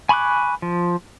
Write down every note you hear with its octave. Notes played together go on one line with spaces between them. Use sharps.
G#5 B5 C#6 D6 F#6
F3